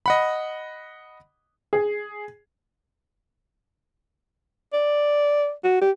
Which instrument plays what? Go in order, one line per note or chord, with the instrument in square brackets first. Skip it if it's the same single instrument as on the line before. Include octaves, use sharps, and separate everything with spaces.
[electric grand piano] D#5 F#5 B5
[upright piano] G#4
[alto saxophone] D5
F#4
G4